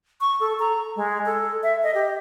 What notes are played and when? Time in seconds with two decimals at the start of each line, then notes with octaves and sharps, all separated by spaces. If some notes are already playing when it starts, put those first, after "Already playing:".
0.21 C#6
0.40 A4
0.60 A#5
0.96 G#3
1.26 A4
1.63 E5
1.83 D#5
1.94 G4